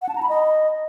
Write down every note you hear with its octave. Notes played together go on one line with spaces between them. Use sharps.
F#5
A5
A#5
B5
D#5